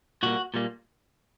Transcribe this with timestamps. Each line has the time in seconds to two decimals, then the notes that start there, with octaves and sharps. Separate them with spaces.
0.23 A#2 G3 A#3 F#4
0.54 A#2 G3 A#3